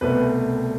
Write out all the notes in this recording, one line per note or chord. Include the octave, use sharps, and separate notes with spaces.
C2 B2 A3 C4 B4